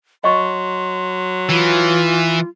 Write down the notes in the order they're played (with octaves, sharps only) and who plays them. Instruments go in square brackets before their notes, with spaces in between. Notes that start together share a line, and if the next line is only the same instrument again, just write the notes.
[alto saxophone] F#3 [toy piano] D#5 C#6 [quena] C6
[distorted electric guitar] E3 [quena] F4